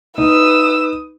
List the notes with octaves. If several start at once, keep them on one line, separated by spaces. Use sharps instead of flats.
D#4 B4 D#6 E6